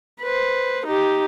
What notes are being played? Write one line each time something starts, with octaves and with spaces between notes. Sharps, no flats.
B4 C5
D#4 G4